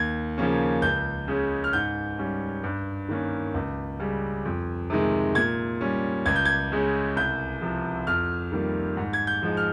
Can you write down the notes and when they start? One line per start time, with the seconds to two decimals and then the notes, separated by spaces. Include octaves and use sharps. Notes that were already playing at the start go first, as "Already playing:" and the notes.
Already playing: D#2 G#6
0.38 C#3 F3 A#3 C#4
0.82 C#2 G6
1.28 C#3 G#3 C#4
1.64 F6
1.73 G#2 G6
2.18 G3 C#4
2.64 G2
3.09 D#3 A#3 C#4
3.54 C#2
4.00 C#3 G3
4.45 F2
4.90 C3 D#3 G#3
5.35 A#2 G#6
5.81 G3 C#4
6.26 C#2 G#6
6.36 G6
6.45 G#6
6.72 C#3 G#3 C#4
7.16 C2 G6
7.62 C3 F3
8.07 F2 F6
8.52 D#3 G3 A#3
8.97 G#2
9.13 G#6
9.27 G6
9.43 F3 G#3 D#4
9.57 F6